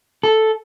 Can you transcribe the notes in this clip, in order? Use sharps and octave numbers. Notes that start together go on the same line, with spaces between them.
A4